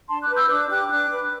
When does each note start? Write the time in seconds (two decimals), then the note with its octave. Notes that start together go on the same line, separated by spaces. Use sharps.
0.08 D4 A5 C6
0.22 D6 F#6
0.29 B4
0.36 E6 G6
0.50 D4 D6 F#6
0.70 G4 D6 F#6
0.91 D4 D6 F#6
1.11 B4